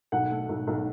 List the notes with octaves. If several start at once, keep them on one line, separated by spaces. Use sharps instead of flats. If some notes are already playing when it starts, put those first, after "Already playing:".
B1 F#5
A3
B1
B1